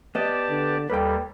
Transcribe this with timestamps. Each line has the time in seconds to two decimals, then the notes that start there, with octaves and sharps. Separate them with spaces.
0.15 B3 G4 D5 D#5 A5
0.51 D3
0.90 D#2 G3 A4 B4 G5